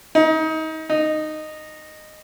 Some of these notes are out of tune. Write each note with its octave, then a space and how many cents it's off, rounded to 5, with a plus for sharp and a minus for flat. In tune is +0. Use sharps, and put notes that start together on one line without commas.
D#4 +30
D#4 -10